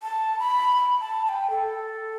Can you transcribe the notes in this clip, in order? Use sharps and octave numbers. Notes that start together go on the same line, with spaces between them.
A5
B5
B5
A5
A5
G5
A4